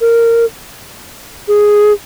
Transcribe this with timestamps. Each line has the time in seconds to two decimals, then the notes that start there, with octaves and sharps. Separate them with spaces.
0.01 A#4
1.48 G#4